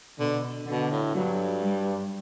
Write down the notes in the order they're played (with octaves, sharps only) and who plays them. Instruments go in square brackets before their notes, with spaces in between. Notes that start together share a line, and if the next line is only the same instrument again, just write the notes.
[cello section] B2 [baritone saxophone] D3
[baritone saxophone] B2 [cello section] D3
[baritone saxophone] A2
[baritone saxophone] G2 [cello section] F#3
[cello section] G3